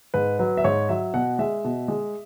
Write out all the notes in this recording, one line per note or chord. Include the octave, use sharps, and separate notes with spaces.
G#2 B4
F#3 B4
E5
G#2 C#5
F#3 E5
B2 F#5
G#3 E5
B2
G#3